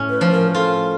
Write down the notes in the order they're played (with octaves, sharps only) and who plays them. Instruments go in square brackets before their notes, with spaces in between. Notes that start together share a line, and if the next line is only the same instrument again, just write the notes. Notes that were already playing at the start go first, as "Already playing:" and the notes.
Already playing: [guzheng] A2 C#4
[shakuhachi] B4
[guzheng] F3
[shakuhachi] A#4
[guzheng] F4 [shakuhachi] A4